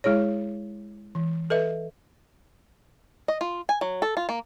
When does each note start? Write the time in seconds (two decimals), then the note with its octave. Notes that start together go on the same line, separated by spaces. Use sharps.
0.04 G#3 E4 G#4 C#5
1.15 E3
1.50 A4 B4 D#5 E5
3.28 D#5
3.41 F4
3.69 G#5
3.81 F#3
4.02 A4
4.17 F4
4.29 A#3